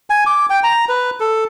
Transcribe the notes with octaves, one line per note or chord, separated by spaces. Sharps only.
G#5
D6
G5
A#5
B4
A4